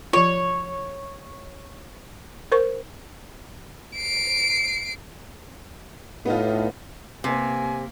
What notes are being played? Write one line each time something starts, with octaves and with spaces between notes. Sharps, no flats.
F3 F4 C#5
A#4 C5 C#6
C7 D7
A2 B3 D#4 F4
C3 A#3 B3 G4 C5 G#5